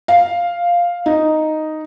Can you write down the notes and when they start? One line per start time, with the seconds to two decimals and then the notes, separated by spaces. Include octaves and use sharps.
0.08 F5
1.06 D#4